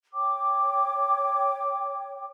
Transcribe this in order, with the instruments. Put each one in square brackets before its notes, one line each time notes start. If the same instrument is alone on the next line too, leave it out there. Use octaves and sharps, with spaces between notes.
[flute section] C#5 G5 D6